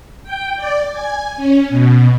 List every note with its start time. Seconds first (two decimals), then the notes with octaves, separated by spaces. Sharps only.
0.24 G5
0.56 D5
0.92 G#5
1.37 C#4
1.69 B2